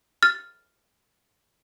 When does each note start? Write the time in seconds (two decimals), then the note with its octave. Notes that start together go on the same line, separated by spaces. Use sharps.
0.23 F6 A6